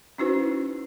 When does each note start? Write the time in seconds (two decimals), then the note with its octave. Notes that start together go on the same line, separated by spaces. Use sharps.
0.18 C#4 D#4 E4 F#4 B4 C5